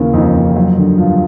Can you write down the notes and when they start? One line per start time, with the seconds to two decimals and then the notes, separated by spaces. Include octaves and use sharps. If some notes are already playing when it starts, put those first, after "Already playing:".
Already playing: D#2 C#3 E3 A#3
0.13 F2 D#4
0.34 F2
0.56 F#3
0.78 D3
0.98 G2 F4